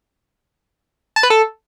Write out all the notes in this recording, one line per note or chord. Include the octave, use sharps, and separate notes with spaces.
A5
B4
A4